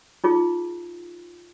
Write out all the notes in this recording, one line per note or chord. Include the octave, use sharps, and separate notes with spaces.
D#4 F4 G#4